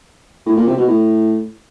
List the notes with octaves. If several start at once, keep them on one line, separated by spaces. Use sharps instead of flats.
A2
A#2
C3
B2
A2